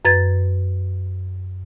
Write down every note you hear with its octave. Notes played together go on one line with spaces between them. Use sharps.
F#2 B4 G#6 A6